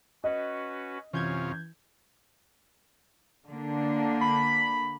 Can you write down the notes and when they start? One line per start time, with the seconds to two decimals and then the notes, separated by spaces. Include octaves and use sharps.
0.24 C#4 F#4 B4 D#5
1.13 F#2 C3 E3 C#4 F4 G6 G#6
3.48 D3 A#3 D4
4.21 B5